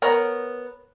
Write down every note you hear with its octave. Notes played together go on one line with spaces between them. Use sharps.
B3 A#4 C#5 A#5